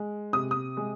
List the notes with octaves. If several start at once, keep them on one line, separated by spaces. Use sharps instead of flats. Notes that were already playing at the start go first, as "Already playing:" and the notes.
Already playing: G#3
C3 D#6
D#6
G#3